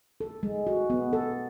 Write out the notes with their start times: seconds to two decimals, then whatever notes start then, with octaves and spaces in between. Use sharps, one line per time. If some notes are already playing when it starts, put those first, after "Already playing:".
0.21 A4
0.43 G#3
0.67 F#4
0.90 B3
1.13 A4